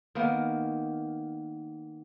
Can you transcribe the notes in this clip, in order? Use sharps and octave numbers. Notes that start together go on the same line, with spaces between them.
D#3 A#3 B3